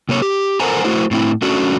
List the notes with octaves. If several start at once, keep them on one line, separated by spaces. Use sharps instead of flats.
C3 A#3 C#5
G4
A4 A#4 C5 F#5 G#5 A#5
A3 E4 F#4 C5
A2 C4 E4
A3 C#4 D4 F#4